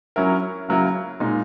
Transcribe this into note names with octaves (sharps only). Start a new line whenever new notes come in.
F#3 C#4 E4 A#4
C#3 F#3 A#3 E4 A#4
A#2 G#3 D#4